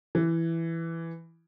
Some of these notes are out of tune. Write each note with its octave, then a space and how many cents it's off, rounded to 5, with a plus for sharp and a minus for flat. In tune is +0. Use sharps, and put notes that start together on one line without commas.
E3 +5